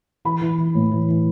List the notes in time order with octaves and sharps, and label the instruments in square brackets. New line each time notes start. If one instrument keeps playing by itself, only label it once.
[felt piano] E3 B5
E3
E3
A2
E3
E3